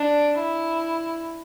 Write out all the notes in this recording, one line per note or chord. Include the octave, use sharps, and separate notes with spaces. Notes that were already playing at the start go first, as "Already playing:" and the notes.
Already playing: D4
E4